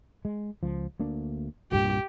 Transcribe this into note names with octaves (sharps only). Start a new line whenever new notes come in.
G#3
C#2 F3
D2 A#3 D4
C2 G2 A#2 G4